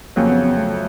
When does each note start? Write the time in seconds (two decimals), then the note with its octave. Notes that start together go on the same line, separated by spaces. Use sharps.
0.16 F2 C#3 F#3 A#3
0.29 B3
0.44 B3
0.57 A3